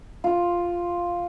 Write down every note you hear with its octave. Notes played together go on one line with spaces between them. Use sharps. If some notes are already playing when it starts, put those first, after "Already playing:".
F4